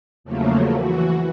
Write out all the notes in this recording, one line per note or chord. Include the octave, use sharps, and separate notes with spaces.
E2 C#3 F3 F#3 A3 A#3
E3 F#4